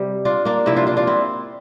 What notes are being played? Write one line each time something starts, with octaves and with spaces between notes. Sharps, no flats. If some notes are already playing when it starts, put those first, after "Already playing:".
Already playing: C3 G3
D4 F4
A#3 D4
C3 F3 C4 E4
D4 F4
D4 F4
D4 F4
C4 E4